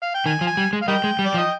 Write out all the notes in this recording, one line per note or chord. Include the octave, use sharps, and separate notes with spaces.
F5
G5
D#3 G#5
F3
G#5
G3
G#3
F5
G3 A#4 D#5 G5
G#3
G3
D5
F3
D#5